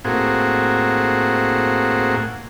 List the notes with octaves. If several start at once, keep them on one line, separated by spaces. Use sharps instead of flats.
A2 A#3 C4 F#4 G#4